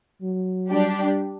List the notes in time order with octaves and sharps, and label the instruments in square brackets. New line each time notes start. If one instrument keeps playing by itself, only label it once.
[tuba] F#3
[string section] G3 D4 G4